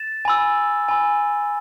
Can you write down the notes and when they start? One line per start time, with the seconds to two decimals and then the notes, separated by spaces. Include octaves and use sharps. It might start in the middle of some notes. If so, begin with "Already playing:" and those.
Already playing: A6 E7
0.25 G#5 B5 E6
0.88 G#5 B5 E6